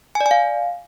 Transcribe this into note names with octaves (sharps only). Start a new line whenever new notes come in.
G#5
D5
G#5
F5